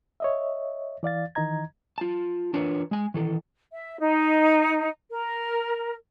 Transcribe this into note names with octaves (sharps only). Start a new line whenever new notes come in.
C#5 D#5 E5
E3 D5 F5 A6
D#3 E3 D#5 A#5 G#6
F4 A5
E3 D4 F4 A#4 B4 C#5
G#3 G#5
D#3 E3 A4
E5
D#4
A#4